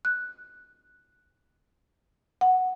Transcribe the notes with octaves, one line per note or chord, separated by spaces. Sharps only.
F#6
F#5